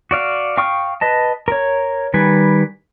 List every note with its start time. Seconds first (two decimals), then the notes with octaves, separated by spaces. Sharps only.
0.11 F#4 D5 F5
0.57 F5 G5 C#6 D#6 F6
1.01 B4 D#5 A5
1.48 A#4 C#5
2.14 D#3 G3 B4 G#5